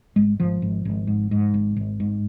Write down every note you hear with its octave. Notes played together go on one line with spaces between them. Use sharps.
G#1 G#3
G#1 F3
G#1
G#1
G#2
G#2
G#1
G#1
G#2